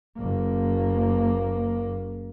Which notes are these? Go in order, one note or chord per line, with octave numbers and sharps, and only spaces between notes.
F#1 A#3